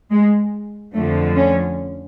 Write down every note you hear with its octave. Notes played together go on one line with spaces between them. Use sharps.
G#3
F2 D3 F3 A3
C#4